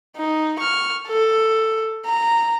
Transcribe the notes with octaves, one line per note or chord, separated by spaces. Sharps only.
D#4
C#6 F6
A4
A#5